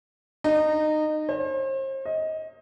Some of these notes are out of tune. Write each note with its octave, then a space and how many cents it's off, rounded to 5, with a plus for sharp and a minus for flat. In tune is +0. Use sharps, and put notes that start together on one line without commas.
D#4 -20
C5 +40
D#5 +20